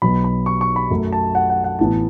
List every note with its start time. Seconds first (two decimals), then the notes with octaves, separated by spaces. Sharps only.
0.02 B1 B2 F#3 B3 B5
0.24 B5
0.46 C#6
0.61 C#6
0.76 B5
0.90 F#2 F#3 A3
1.12 A5
1.35 F#5
1.50 F#5
1.64 F#5
1.79 A1 A2 E3 B3 A5